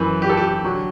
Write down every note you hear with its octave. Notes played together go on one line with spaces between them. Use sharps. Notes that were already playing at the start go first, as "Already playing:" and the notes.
Already playing: F#2 E3
G4
A4
G4
D3 F#3